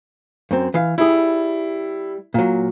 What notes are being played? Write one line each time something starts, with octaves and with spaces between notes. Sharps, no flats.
F#2 C4
E3 F5
G3 E4 G#4
A#2 F#3